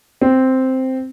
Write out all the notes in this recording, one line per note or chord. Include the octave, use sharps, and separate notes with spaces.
C4